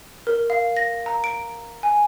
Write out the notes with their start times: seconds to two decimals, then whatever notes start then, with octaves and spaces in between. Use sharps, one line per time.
0.27 A#4
0.50 F5
0.77 A#6
1.06 A#5
1.24 D7
1.83 G#5